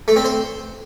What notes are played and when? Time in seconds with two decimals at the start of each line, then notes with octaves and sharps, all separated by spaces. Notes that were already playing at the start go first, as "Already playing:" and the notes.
0.08 A3
0.16 C4
0.25 C5